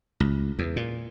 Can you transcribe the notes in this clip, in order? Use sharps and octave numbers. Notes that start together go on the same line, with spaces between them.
C#2
E2
A#2